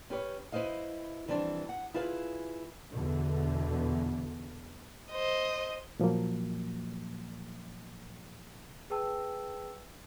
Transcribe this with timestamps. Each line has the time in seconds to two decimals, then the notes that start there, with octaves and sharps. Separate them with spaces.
0.10 C#4 G4 B4 C#5
0.52 E4 B4 C5 D#5 F5
1.28 F2 E3 G3 C4 D4
1.69 F#5
1.94 E4 F4 G#4 B4 E5 F5
2.91 E2 B2 D3
5.11 C5 D#5
6.00 A#2 F3 F#3 A#3
8.90 G#4 B4 G5 A5 E6